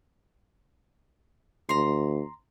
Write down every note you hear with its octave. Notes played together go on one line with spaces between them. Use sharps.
D2 A#5 C6